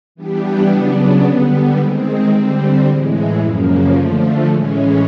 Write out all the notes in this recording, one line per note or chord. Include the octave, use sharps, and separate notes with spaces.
E3 G3 B3 D4 G4
C#3 F#3 B3 D4
D3 G3 B3
D#3 G#3 C4
D3 G3 C4
A2 E3 G#3
F#2 C#3 F3 A#3
D3 F3 A3
A2 E3 G#3 C#4